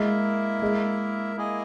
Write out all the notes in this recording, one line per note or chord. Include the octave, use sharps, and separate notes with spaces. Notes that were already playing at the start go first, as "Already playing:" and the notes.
Already playing: G#3 A#3 E4 A#4 E5
G#3
A#3 E4 G#4 D#5 G#5